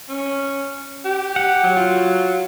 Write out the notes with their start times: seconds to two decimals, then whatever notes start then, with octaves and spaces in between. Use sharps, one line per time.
0.09 C#4
1.05 G4
1.36 F#5
1.63 F#3
1.77 F4